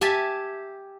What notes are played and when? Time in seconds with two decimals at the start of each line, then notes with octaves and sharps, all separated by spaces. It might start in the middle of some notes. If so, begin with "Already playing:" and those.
0.01 G4 E5 G#5 A5